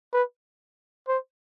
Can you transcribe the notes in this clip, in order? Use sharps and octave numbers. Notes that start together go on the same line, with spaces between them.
B4
C5